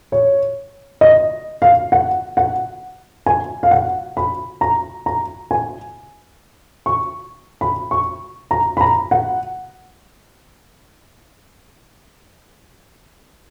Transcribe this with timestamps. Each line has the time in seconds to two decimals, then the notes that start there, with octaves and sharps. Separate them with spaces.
0.12 C#5
1.01 D#5
1.62 F5
1.92 F#5
2.37 F#5
3.26 G#5
3.63 F5
3.71 F#5
4.17 B5
4.61 A#5
5.06 A#5
5.51 G#5
6.86 C#6
7.61 B5
7.91 C#6
8.51 A#5
8.77 B5
8.81 A#5
9.11 F#5